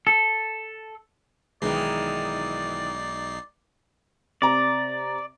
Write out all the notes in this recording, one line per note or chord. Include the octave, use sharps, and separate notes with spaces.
A4
B1 D#3 E3 G#3 D#4 D5 C7
C3 D5 A#5